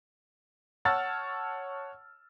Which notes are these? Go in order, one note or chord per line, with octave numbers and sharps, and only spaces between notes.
C#5 F#5 A5 E6 F6 A6